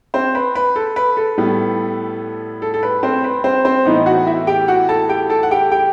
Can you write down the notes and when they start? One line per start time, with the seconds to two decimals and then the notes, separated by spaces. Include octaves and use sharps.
0.14 C4 C5
0.35 B4
0.55 B4
0.76 A4
0.96 B4
1.17 A4
1.38 A2 G3 B3
2.62 A4
2.74 A4
2.83 B4
3.03 C4 C5
3.24 B4
3.44 C4 C5
3.65 C4 C5
3.85 A2 E3 B3 D#4 D#5
4.06 F#4 F#5
4.27 E4 E5
4.47 G4 G5
4.68 F#4 F#5
4.89 A4 A5
5.09 G4 G5
5.30 A4 A5
5.43 F#5
5.51 G4 G5
5.71 G4 G5